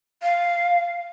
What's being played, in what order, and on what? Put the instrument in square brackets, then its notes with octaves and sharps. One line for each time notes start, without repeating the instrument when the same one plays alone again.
[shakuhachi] F5